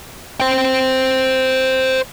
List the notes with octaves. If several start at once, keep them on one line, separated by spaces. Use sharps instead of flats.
C5 G5